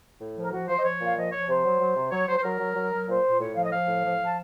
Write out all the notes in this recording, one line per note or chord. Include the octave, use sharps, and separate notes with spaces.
A2
F3
A#4
F3 F#4
F3 C5
D#5
F3 C#5
A#2 F5
F3 D#5
F3 C#5
C3 C5
F#3
F#3
C3
F#3 C#5
F#3 C5
C5
F#3 A#4
F#3
F#3
F#3
A#2 C5
A#2
A2 C#5
F3 F5
D#5
F3 F5
A2
F3
F3
A5